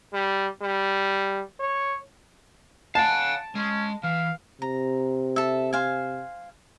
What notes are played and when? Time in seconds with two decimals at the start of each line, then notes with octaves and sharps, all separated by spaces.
0.13 G3
0.62 G3
1.60 C#5
2.95 F5 F#5 G#5 A5
3.55 G#3 C#4
4.04 E3 F5
4.62 C3 A#5
5.36 A4 E5
5.73 C5 F5 G#5